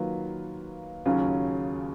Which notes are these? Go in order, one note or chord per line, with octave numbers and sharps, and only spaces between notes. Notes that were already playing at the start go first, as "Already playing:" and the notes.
Already playing: D#3 F#3 A#3 F4 B4
D#2 C#3 F#3 C#4 F4